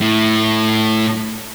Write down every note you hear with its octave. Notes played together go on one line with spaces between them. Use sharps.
A2